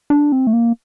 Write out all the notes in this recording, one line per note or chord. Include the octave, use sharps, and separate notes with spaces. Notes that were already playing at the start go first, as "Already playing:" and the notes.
D4
C4
A3
A#3